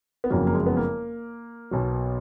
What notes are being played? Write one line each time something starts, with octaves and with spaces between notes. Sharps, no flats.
B3
F#1 F2 C#3 F#3 A#3
A#3
G#3
B3
A#3
B1 B2 F#3